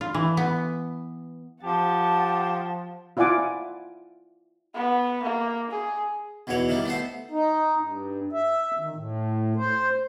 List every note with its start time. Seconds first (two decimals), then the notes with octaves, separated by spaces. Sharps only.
0.01 F4
0.14 E3
0.37 B3
1.63 F3 G4 F#5 A5
3.17 E4 F4 D5 F#5 G#5 D6
4.74 B3
5.22 A#3
5.70 G#4
6.47 B1 E2 B2 E3 C#5
6.69 D#3 E3 G3
6.86 A3 B3 C5
7.31 D#4
7.81 G2
8.32 E5
8.79 D#3
8.96 A2
9.56 C5